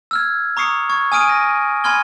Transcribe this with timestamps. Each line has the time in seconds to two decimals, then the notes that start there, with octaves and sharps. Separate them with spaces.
0.11 E6 F6 G#6
0.57 A#5 C#6 D#6 C7 C#7
0.90 C#6 G#6
1.12 G#5 D#6 F6 D7 D#7
1.29 A#6
1.84 G#5 B5 C6 F6 G#6 G7